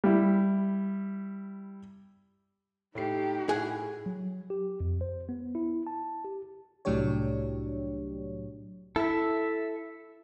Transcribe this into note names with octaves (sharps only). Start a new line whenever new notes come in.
G3 E4
A2 A3 D#4 G4 C7
A2 E4 G#4 F#5
F#3
G4
F2
C5
B3
E4
A5
G4
C2 A2 F#3 D4 G4 C#5
E4 A4 E5